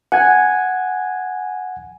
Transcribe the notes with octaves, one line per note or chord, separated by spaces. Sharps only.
F#5 G#5 G#6